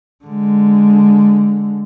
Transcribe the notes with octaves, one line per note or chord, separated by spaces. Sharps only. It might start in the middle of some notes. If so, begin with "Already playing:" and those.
D3 G#3